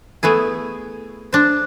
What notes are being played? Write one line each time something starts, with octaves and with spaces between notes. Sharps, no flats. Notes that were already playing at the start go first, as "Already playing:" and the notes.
A3 B3 E4 G#4
D4 C5